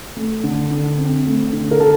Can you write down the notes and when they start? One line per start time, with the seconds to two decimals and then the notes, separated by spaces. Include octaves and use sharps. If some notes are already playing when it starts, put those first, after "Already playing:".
0.17 A3
0.43 D3
0.71 D3
0.98 C4
1.26 A3
1.53 D3
1.71 A#4
1.80 D3 A4